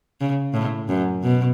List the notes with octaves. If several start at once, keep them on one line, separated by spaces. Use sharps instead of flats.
C#3
A2
F#2
B2